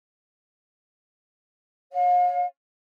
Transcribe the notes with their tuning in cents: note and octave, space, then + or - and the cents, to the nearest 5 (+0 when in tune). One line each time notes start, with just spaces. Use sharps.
C#5 +0 F5 +40